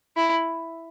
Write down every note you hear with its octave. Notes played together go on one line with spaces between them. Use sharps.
E4